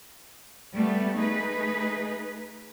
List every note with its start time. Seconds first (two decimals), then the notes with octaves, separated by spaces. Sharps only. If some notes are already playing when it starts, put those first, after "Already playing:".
0.75 G3 A3 B3
1.16 A3 D#4 G#4 B4